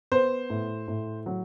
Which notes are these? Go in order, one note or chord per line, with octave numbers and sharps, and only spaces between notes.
B3 C5
A2
A2
F#3